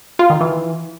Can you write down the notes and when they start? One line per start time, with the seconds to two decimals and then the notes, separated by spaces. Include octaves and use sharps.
0.19 F4
0.30 D#3
0.40 E3